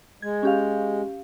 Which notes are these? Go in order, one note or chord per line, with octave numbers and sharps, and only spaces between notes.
G#3 G#6
C#4 G4 F5